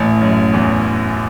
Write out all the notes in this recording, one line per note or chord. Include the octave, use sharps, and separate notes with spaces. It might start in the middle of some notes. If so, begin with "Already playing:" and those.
Already playing: A1 A2
F#2
E2